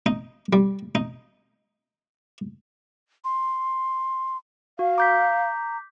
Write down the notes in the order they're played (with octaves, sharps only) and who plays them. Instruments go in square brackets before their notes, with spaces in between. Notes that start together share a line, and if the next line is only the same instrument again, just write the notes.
[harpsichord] D#4
G3
D#4
[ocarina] C6
[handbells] F#4 [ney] F5
[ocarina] A#5 [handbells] D6 G6 B6